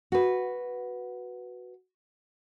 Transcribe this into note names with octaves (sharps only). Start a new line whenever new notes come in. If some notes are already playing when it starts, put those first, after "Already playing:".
F#4 B4